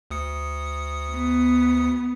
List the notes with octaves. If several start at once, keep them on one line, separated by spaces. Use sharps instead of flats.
D2 D#6 C#7
B3